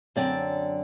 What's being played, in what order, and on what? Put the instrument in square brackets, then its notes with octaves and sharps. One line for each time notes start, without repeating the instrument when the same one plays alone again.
[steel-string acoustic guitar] F#2 D3 F#3 C4 D5